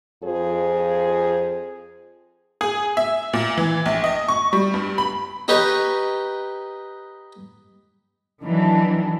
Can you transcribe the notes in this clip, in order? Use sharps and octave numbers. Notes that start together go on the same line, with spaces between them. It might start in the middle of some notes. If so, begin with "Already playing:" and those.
F2 F4 G#4 C5
G#4
E5
A#2
E3
A#1
D#5
C#6
G3
G2
B5
D#4 G4 B4 C#5
D#3 E3 F#3 D4